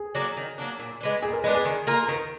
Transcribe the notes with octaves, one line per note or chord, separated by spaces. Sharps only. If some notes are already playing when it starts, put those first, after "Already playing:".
Already playing: G#4
F#3 A#3 D4
D#3
F#3 A#3 D4
A#2
G#3 B3 D4
A#2 G#4
A#4
G#3 B3 D4 B4
G#4
D#3
A#3 F4 A#4
D#3 A#4